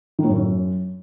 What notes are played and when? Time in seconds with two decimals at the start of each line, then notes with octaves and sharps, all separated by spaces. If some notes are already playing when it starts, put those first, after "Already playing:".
0.19 D#3
0.24 A2
0.29 F#2